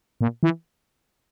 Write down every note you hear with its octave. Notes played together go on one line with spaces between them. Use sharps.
A#2
E3